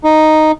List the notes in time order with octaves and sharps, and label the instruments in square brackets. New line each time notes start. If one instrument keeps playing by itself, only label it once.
[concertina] D#4